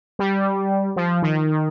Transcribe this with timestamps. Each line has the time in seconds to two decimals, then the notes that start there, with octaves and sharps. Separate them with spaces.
0.19 G3
0.96 F3
1.22 D#3